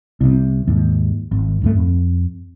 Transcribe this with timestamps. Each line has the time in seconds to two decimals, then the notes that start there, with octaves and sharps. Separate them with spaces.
0.21 C2 C3
0.68 D#2 G#2
1.31 G#1
1.62 D2 G#2 A3
1.75 F2